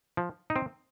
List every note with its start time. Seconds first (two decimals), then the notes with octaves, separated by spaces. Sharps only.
0.17 F3
0.50 D#4
0.56 C4